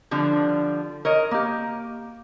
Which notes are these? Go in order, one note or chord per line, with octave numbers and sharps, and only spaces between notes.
D3 F3 G3 D4
A#4 C#5 D#5
A#3 G4